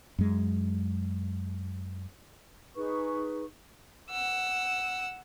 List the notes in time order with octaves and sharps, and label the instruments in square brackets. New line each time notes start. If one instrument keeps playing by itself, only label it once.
[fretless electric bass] F#2 G#3
[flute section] D#4 G#4 B4 C#6
[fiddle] F#5 E6